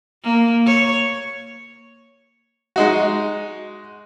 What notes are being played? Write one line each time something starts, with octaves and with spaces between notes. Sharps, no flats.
A#3
C#5
G#3 D#4 F#4